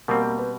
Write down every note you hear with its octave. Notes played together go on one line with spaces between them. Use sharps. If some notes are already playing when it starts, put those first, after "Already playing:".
B2 G3 A#3 C4
A#3
B3